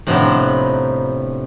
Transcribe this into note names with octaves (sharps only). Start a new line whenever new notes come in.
A2 C3 F3 B3 D4 D#4